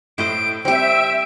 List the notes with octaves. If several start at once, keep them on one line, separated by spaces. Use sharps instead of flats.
A2 C5 D#5 E5 D7
G3 C4 G4 E5 D7